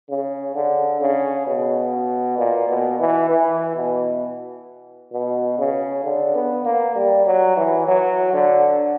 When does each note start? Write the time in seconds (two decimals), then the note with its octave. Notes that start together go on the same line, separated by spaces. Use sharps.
0.09 C#3
0.55 D3
1.01 C#3
1.47 B2
2.38 A#2
2.69 B2
2.99 E3
3.29 E3
3.76 B2
5.12 B2
5.58 C#3
6.04 D3
6.35 B3
6.65 A#3
6.96 G3
7.26 F#3
7.57 E3
7.87 F#3
8.33 D3